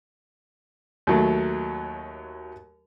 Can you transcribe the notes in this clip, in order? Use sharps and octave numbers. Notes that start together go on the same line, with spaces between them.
D#2 F#3 A3